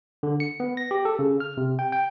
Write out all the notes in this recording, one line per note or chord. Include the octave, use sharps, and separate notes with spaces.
D3
C#7
B3
A#6
G4
A4
C#3
F6
C3
G5
G5